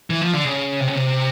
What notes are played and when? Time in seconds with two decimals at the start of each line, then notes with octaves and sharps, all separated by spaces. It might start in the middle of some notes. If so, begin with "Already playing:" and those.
0.10 E3
0.21 F3
0.33 D3
0.45 C#3
0.80 C3
0.88 C#3
0.95 C3